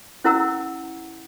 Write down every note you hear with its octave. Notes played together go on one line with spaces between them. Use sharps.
C#4 E4 A#4 F#5 A#5 E6